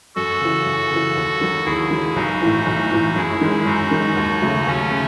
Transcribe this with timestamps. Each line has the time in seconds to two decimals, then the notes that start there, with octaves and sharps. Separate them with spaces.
0.16 F#2 F#4 A4
0.41 C#3 E3
0.65 F#2
0.91 C#3 E3
1.16 D#2
1.41 D#3 F#3
1.66 D#2 E4 G#4
1.91 D#3 F#3
2.16 B1 D#4 F#4
2.42 A2 E3
2.66 B1
2.91 A2 E3
3.16 F#2 E4 G#4
3.41 D#3 G#3
3.66 F#2 D#4 F#4
3.91 D#3 G#3
4.17 D#2
4.42 C#3 F#3 A3
4.66 D#2 A3 C#4
4.91 C#3